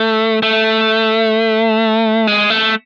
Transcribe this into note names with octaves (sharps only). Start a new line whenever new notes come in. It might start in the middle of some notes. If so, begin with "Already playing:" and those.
Already playing: A3
A3
G#3
A3